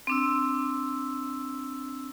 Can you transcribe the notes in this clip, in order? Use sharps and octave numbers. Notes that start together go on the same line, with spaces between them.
C4 D4 E6